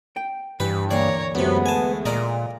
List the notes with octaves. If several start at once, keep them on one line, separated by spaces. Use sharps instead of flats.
G5
G2 E3 G4 B4
D2 E3 A#3 C#5 D5 A#5
F#2 C3 G#3 A3 B3
G#5 A5
A#2 A#4 D5 D#5